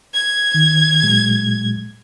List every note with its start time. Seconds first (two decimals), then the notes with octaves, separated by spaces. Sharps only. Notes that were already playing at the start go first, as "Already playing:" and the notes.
0.14 G#6
0.54 D#3
1.03 A#2 F#3 G#3